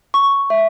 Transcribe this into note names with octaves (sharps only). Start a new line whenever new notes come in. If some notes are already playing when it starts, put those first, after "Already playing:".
C#6
E5